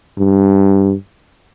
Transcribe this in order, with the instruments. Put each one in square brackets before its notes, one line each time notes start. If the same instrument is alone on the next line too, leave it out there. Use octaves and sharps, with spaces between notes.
[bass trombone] G2